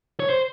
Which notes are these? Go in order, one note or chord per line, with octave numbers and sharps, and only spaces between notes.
C#5
C5